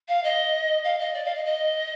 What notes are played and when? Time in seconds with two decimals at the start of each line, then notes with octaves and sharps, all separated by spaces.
0.08 F5
0.24 D#5
0.84 F5
0.99 D#5
1.14 D5
1.25 F5
1.35 D#5
1.45 D#5